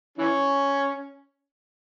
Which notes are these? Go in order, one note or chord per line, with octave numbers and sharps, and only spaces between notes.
E3 C#4